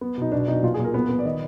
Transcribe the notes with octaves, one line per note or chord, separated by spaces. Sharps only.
B3
B2 D#4
B2 D4
B2 D#4
A#2 F4
G#4
A#2
A#4
B3 B4
B3
D5
D#3 D#5